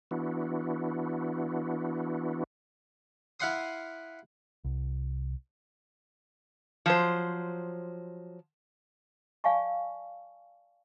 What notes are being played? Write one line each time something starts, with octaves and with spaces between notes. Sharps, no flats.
E3 B3 D4 E4 F#4
E4 F5 F#5 G#5 C6 D#6
C2
F3 F#3 C5
D5 F5 G#5 A5 C#6